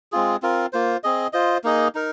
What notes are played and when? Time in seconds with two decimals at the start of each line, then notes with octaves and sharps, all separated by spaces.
0.12 G#3 C4 F4 G#4
0.42 C4 F4 A#4
0.73 A#3 F4 C5
1.03 C4 G#4 D#5
1.33 F4 C5 D#5
1.64 A#3 D#4 G#4 D#5
1.95 D#4 A#4